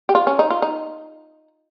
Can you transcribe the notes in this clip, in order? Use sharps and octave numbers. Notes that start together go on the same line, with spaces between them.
G4
F4
C#4
D#4
F4
D#4